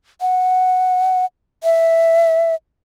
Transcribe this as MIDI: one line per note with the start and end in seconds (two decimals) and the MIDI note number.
0.21 1.25 78
1.64 2.55 76